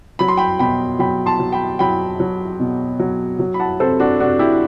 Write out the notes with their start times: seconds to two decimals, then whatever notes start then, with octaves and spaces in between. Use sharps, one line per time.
0.19 F#3 B5
0.28 C6
0.37 G5 B5
0.59 B2 G5 B5
0.99 F#3 G5 B5
1.26 A5 C6
1.40 F#3
1.53 G5 B5
1.79 F#3 G5 B5
2.20 F#3
2.60 B2
3.00 F#3
3.39 F#3
3.54 B5
3.60 F#5 A5
3.80 C3 A4 C5
4.00 D4 F#4
4.19 C3 D4 F#4
4.39 E4 G4